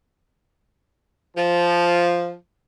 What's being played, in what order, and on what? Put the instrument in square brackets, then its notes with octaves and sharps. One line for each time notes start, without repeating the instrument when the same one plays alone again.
[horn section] F3